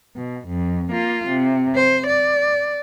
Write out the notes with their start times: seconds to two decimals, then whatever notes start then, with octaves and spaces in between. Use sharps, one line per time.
0.16 B2
0.48 F2
0.92 A#3 F4
1.28 C3
1.76 C5
2.07 D5